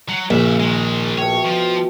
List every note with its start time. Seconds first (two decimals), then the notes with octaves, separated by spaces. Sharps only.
0.09 F#3
0.30 A#1 C#3 E5
0.60 D#3 G#3
1.18 B2 A3 C#5 G5
1.45 F3